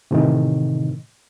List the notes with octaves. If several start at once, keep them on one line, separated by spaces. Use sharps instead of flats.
A2 C3 D#3 E3 A3 D#4